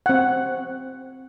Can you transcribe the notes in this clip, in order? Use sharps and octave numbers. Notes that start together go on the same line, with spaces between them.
C4 F#5